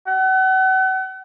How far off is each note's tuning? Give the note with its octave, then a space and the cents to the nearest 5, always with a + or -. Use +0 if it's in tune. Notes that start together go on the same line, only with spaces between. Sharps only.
F#5 +35